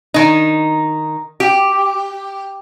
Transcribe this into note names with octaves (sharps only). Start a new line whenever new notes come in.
D#3 D#4
G4